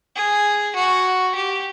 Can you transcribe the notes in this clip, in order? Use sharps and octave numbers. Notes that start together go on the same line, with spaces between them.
G#4
F#4
G4